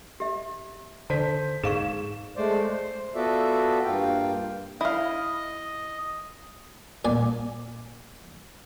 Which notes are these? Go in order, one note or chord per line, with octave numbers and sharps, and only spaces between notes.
G4 E5
D3 C5 A5 B6
G#2 G#4 F5 C#6 E7
G#3 A3 C5 D5
C5
B3 F4 F#4 A4 D5 E5
G2 A#3 F4 F5 G5
E4 D#5 F5
A#2 D5 G#5